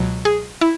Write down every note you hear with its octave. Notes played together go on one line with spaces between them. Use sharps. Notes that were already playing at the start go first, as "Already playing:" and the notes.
Already playing: C#2 B2 F#3
G#4
E4